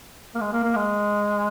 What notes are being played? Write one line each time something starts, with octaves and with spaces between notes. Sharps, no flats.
A#3
G#3
A#3
A#3
G#3